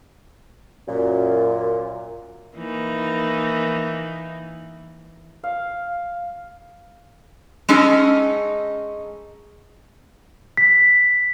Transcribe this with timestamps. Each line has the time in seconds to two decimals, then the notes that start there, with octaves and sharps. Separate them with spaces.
0.88 F#2 A#2
2.57 E3 A#3 D#4
5.43 F5
7.69 G#3 C#4 D#4 G#4 A4
10.57 B6